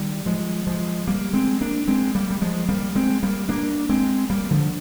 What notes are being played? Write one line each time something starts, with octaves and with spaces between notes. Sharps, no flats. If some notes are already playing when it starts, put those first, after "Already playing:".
Already playing: D#3 G3
F3 G#3
F3 G#3
G3 A#3
G#3 C4
A#3 D4
G#3 C4
G3 A#3
G3
F3 G#3
G3 A#3
G#3 C4
G3 A#3
A#3 D4
G#3 C4
G3 A#3
D3 F3